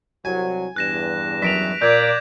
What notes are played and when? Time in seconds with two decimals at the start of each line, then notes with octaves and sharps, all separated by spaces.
0.25 C2 F#3 G#5
0.76 E2 G2 F#6 A#6 E7
1.42 F#2 B6 D7 F7
1.82 A#2 D5 G6 G#6